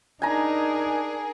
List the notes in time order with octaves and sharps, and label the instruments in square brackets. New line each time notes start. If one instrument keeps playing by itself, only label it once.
[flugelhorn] D4 [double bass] D#4 [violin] G#4 A#4 [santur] G#5 A#5